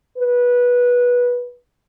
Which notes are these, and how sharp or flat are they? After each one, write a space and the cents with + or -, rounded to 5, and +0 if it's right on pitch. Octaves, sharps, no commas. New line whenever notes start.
B4 -15